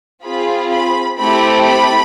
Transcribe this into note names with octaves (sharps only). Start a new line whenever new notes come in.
C4 F4 G#4 B5
B5
A3 C4 E4 G4 B5
B5